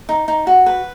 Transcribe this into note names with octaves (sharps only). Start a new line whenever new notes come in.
D#4
D#4
F#4
B4